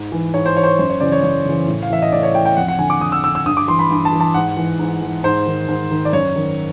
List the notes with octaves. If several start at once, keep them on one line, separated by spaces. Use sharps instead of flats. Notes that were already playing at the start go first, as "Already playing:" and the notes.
Already playing: G#2
E3
G#2 C#5
C5
E3 C#5
C5
C#5
F#2 C5
C#5
C#3 E3 D5
C#5
F#2 C#5
C#3 E3
A2
F5
E3 E5
D#5
A2 D5
C#5
E3 G5
G5
F2 F#5
F#5
D3 G#5
D6
F2 D#6
E6
D3 E6
E6
G2 D#6
D6
E3 C6
B5
G2
A5
E3
A5
G#2 F#5
E3
G#2
E3
G#2 C5
D#3
G#2
D#3
D5
F#2 C#5
D#3